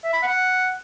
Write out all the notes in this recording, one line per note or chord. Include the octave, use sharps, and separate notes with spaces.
E5
B5
F#5